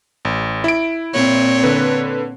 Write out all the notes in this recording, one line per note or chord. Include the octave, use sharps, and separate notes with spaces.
A1
E4 D7
A#2 C4 C#5
D3 B4